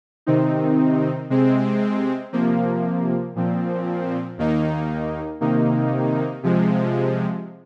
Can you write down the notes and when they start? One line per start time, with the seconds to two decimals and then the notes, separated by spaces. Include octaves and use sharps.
0.26 C3 D#3 C4 D#4
1.30 C3 G#3 C4
2.33 C3 F3 A#3
3.36 A#2 F3 C4
4.38 D#2 D#3 A#3 D#4
5.41 C3 D#3 A#3 D#4
6.43 C3 F3 G#3